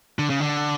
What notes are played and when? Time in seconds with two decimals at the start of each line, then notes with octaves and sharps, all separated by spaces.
0.19 D3
0.30 C#3
0.40 D3